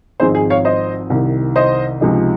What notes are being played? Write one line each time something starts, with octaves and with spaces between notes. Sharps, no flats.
G#1 G#2 F3 C4 D#4 G#4 C5
G#4
C#5 F5
C5 D#5
C2 C3 D#3
C5 D#5
C#2 C3 F3 G#3 D#4